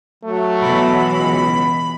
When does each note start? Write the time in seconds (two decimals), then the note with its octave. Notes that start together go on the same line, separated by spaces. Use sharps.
0.24 F#3 A3
0.62 B2 E3 B5
1.16 C#2